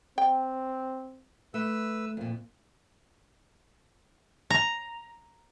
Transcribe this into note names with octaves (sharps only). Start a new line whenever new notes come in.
C4 G5
A3 B4 E6
F2 A#2
A#5